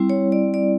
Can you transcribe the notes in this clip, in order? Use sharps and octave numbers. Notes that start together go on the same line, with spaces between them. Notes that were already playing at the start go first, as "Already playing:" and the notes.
Already playing: G3 C4 E4
C#5
D5
D5